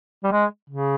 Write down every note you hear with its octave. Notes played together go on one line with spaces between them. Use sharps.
G3
G#3
C#3